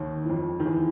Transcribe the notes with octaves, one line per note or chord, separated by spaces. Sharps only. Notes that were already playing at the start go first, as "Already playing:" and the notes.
Already playing: D#2 D#3
E3
F2 F3
D#3
E2 E3